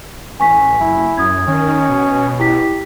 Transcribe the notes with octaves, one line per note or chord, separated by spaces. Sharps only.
A1 G#5 C#6 B6
F#1 E4
F#2 D#6 G#6
D#3 C#4
B2
E4 G4 B6